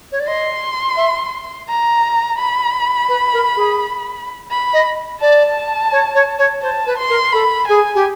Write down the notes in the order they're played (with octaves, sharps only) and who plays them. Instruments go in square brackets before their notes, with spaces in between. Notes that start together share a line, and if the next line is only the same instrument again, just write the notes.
[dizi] C#5
D5
[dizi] D#5 [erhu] C6
[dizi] E5
[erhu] A#5
B5
[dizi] B4
A#4
G#4
[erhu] B5
[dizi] D#5
[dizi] D5 [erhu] A5
[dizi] C#5
C#5
C#5
[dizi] C5 [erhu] A5
[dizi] B4
[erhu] C6
[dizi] A#4
[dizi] A4 [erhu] B5
[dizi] G#4 [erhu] G#5
[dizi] G4